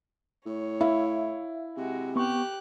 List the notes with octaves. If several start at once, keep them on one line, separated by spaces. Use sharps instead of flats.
A2 C#5
E4 E5 F5
C3 G#3 F#4
B3 G4 C#6 F#6